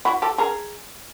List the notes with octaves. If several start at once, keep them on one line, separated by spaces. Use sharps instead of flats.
E4 F#4
G4 A4
G#4 A#4